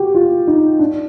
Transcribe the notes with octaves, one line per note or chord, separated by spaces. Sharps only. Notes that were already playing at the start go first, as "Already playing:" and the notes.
Already playing: F#4 G4
F4
D#4
D4